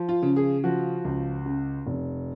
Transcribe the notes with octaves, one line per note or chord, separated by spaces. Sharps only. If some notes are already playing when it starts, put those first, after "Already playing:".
Already playing: F3
F4
C#3
G#4
F3 F#4
C#2
C#3
F1